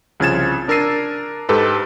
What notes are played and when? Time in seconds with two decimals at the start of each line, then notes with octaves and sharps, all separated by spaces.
0.20 C2 C#3 F3 G#6 A6 E7
0.68 D4 A#4 E6 A6 C7 D#7
1.49 G#2 G4 A4 B4